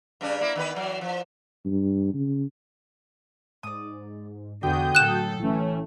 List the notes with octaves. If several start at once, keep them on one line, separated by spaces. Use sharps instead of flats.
G2 C#3 D4
A#3 E4
D#3 B3 B4
E3 F#3
F3
G2
C#3
G#2 D5 D#6
E2 D3 F#4 G5 G#5 D#6 G6
A2 F#3 A4 F#6 E7
A1 E3 A3 C#4